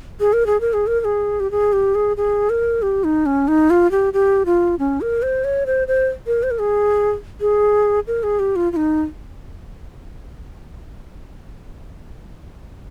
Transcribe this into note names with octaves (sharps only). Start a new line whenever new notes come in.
G#4
A#4
G#4
A#4
G#4
A#4
A#4
G#4
G4
G#4
G4
G#4
G#4
A#4
G4
D#4
C#4
D#4
F4
G4
G4
F4
C#4
A#4
C5
C#5
C5
C5
A#4
C5
A#4
G#4
G#4
A#4
G#4
G4
F4
F4
D#4